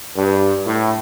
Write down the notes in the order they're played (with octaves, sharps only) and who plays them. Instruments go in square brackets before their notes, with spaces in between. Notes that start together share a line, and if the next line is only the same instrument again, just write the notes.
[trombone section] G2
A2